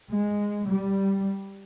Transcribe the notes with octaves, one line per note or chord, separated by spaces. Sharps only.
G#3
G3